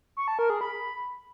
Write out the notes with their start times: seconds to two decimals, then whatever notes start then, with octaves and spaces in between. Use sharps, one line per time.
0.17 C#6
0.28 A5
0.39 A#4
0.50 G#4
0.61 B5